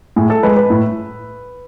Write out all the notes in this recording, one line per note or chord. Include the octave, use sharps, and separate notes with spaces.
A2 G#4
A4
G#3 B4
B4
A2